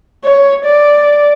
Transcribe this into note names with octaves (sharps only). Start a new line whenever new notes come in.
C#5
D5